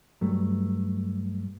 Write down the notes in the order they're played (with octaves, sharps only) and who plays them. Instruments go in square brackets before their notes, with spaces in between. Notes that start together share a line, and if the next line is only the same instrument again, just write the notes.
[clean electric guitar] G2 F#3 A3